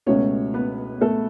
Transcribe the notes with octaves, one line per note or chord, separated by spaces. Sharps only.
C#2 B2 A3 C#4 C#5
B3 B4
A3 A4